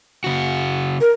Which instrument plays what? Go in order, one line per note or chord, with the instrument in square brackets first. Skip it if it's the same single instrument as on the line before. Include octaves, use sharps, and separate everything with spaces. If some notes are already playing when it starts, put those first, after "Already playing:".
[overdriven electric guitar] C#3 F#4
[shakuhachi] A#4